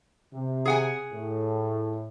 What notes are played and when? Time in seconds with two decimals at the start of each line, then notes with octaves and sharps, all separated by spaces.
0.33 C3
0.65 G#4 F#5 G#5
1.12 A2